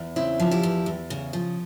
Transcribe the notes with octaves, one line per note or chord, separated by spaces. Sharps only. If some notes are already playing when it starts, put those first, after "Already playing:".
Already playing: E2
C#3 C4 E4
F3
E4 G4
E2
E2
C#3
F3